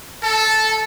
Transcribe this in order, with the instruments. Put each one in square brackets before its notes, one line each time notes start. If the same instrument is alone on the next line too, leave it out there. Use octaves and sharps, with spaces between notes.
[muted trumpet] A4 [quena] A5